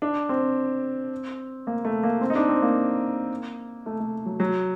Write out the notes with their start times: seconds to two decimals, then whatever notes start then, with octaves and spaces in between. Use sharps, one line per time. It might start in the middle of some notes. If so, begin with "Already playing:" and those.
0.02 D4
0.29 C4
1.67 A#3
1.85 A3
2.03 A#3
2.21 C4
2.30 D#4
2.35 D4
2.49 C4
2.62 A#3
3.86 A3
4.00 A3
4.26 F#3
4.40 F#3